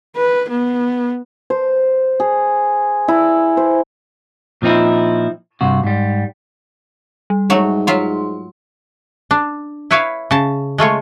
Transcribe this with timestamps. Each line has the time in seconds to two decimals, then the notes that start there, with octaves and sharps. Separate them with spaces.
0.16 B4
0.49 B3
1.50 C5
2.20 G#4
3.08 E4
3.57 C5
4.62 A#2 F3 C4 D#4 E4
5.61 G2 C3 F#4
5.84 G#2 G3
7.30 G3
7.50 G#2 F#3 A3 F#4
7.87 F#3 F4 E5 C6
9.31 D4
9.91 E4 B4 C#5 E5 F5
10.31 C#3 A5
10.78 G#3 A3 F4 C#5